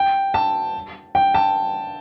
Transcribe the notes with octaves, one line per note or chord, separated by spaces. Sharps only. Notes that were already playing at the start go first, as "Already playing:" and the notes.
Already playing: G5
A5
G5
A5